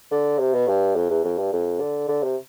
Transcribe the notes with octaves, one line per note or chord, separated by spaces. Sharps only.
D3
C3
B2
G2
F2
E2
F2
G2
F2
D3
D3
C3